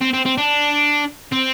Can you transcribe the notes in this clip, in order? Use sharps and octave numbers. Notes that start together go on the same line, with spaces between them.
C4
C4
C4
D4
C4